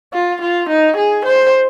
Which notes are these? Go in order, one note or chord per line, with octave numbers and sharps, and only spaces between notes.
F4
F4
D#4
G#4
C5